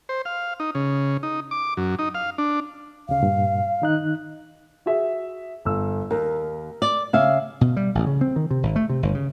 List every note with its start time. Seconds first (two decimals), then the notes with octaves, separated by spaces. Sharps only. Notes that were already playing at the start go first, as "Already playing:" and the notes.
0.09 C5
0.25 F5
0.60 D#4
0.75 C#3
1.23 D#4
1.51 D6
1.77 F#2
1.99 D#4
2.15 F5
2.38 D4
3.09 D2 C#3 F5
3.23 G2 A#2
3.82 D#3 D#4 F#6
4.86 F#4 G#4 E5
5.65 G1 E6
6.11 D#2 A#4
6.82 D5
7.13 C#3 E5 F5
7.61 B2
7.76 G3
7.95 A1
8.07 C#3
8.21 C4
8.36 D#3
8.51 C3
8.63 G#1
8.76 A3
8.89 C3
9.03 G1
9.15 C#3